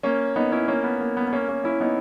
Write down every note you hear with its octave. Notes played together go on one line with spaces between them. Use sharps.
A#3 C#4
B3 D#4
C#4 E4
A#3 C#4
B3
A#3
B3
B3
A#3 C#4
A#3 C#4
C#4 E4
B3 D#4